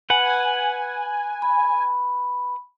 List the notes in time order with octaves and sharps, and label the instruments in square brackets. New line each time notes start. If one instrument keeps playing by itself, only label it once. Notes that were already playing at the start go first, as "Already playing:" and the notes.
[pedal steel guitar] B4 F#5 [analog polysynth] G#5
[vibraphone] B5